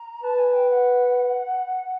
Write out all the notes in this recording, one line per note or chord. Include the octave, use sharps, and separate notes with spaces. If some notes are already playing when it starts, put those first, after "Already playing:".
Already playing: A#5
B4 A5
G#5
G5
F#5